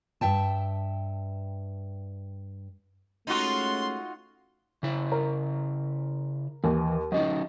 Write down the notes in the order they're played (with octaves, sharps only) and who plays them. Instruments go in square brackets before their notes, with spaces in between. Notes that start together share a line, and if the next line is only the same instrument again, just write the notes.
[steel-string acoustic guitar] G2 E5 G5 A5
[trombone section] G#3 A3 C#4 [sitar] D#4 F4 F#4 [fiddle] C6
[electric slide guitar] C#3 E4
[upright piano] A#4
[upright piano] D#2 [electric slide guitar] E3
[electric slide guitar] F#3 C#4 D#4 [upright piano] D#5